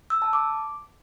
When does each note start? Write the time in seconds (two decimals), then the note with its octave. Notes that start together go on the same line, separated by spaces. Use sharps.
0.10 E6
0.22 A5
0.33 D6